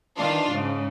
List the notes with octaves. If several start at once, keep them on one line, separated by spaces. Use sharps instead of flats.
D#3 E3 D4 F4
G#2 C#3